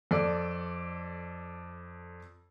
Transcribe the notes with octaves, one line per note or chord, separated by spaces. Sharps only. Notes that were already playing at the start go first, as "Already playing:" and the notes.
F2 A4 D5